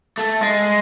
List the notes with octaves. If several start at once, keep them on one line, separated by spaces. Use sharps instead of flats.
A3
G#3